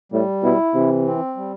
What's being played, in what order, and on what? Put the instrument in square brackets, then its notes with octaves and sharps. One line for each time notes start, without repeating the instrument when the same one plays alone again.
[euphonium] A2 [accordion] G3
[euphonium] B2 [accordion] E4
[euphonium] C3 [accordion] E3
[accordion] C4
G3